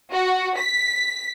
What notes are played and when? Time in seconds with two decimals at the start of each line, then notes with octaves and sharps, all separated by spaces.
0.12 F#4
0.58 B6